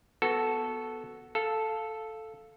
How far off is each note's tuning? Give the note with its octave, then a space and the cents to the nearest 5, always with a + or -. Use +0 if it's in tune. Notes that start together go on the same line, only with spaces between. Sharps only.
B3 +0 F#4 +0 A4 +0
A4 +0 F5 +0